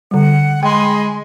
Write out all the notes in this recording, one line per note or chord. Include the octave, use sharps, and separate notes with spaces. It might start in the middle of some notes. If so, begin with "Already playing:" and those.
D3 G3 F#5
G#3 D#5 G5 B5 C6